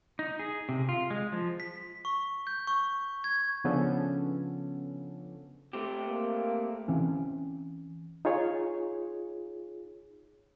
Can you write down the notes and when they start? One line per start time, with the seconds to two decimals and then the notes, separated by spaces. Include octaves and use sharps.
0.19 D#4
0.39 G#4
0.69 C3
0.89 F4
1.10 G#3
1.32 F3
1.60 B6
2.05 C#6
2.47 G6
2.67 C#6
3.24 G#6
3.64 C#3 F3 B3 C#4 D4 A4
5.73 A3 C4 G4
6.06 A#3
6.88 E3 C4 C#4
8.25 D#4 F4 G#4 C#5